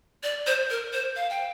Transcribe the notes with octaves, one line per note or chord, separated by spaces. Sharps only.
D5
C5
A#4
C5
F5
G5